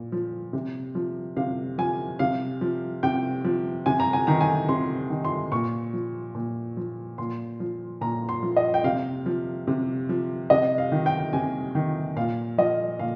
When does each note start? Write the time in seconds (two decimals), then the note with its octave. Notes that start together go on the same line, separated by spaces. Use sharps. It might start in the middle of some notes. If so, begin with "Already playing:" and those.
Already playing: A#2
0.12 F3
0.53 C3
0.95 F3
1.37 C3 F5
1.78 F3 G#5
2.19 C3 F5
2.61 F3
3.03 C3 G5
3.44 F3
3.86 C3 G#5
4.00 A#5
4.13 G#5
4.27 D#3 A#5
4.41 G#5
4.69 C3 C6
5.10 D#3
5.25 C6
5.52 A#2 C#6
5.93 F3
6.35 A#2
6.77 F3
7.18 A#2 C6
7.60 F3
8.01 A#2 A#5
8.29 C6
8.43 F3
8.57 D#5
8.74 G5
8.84 C3 F5
9.26 F3
9.67 C3
10.09 F3
10.50 C3 D#5
10.78 F5
10.92 D#3
11.06 G5
11.33 C3 G#5
11.75 D#3
12.16 A#2 F5
12.58 F3 D#5
12.99 A#2 F5